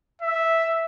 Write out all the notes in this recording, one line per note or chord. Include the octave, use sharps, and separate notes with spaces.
E5